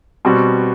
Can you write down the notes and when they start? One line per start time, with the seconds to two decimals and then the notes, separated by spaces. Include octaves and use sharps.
0.25 B2 G3 C4 F#4